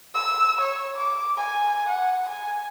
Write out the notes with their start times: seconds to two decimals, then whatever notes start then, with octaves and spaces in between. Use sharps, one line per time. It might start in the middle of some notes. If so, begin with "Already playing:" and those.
0.15 E6
0.61 C#5
0.97 D6
1.37 G#5
1.89 F#5
2.29 G#5